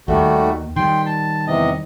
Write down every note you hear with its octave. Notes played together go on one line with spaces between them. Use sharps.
D#2 D#3 G3 A3 F#4
D#3 G3 G5 C6
A5
E2 C3 D#5